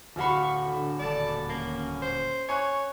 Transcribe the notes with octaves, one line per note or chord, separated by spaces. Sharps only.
D1 F#4 F5 B5 C#6
D3 A4
D#1 A4 D5 A5
A#3 C#4
C5
C#5 G#5 C#6 F#6